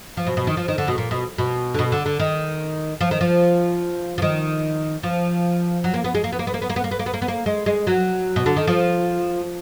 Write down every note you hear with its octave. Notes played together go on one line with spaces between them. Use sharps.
F3
B2
B2
D#3
F3
D#3
D3
B2
A#2
B2
B2
D3
B2
D3
D3
D#3
F3
D#3
F3
F3
D#3
F3
F#3
A#3
B3
G#3
A#3
B3
A#3
B3
A#3
B3
A#3
B3
A#3
B3
A#3
B3
A#3
B3
A#3
G#3
G#3
F#3
B2
D3
D#3
F3